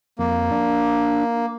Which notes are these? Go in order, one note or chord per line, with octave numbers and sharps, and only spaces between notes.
F2 A#3
D4